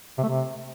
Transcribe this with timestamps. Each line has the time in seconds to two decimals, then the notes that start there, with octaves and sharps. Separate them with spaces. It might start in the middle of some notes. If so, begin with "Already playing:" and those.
0.18 C3
0.23 A3
0.29 C3